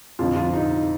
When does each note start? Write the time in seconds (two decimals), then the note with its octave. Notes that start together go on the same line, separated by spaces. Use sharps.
0.19 F2 D3 F3 F4
0.36 F4
0.54 D#4